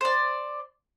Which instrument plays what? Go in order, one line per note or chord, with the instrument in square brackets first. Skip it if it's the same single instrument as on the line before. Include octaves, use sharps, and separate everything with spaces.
[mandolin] C5 D5